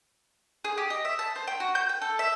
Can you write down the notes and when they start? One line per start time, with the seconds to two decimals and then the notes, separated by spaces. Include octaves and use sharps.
0.65 G#4
0.78 G4
0.90 D#5
1.05 E5
1.19 A5
1.36 C5
1.47 G5
1.60 F#4
1.75 G6
1.89 G5
2.02 A4
2.19 E5